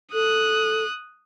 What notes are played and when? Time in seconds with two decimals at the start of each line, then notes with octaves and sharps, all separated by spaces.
0.13 A4 D#6 F#6